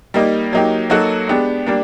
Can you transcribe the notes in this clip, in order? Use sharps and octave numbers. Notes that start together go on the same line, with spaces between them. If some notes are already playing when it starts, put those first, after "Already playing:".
G3 A#3 D#4
F#3 A#3 D#4 G4
F#3 A#3 D#4 F#4 A4
G#3 B3 D4 G4
G3 A#3 D4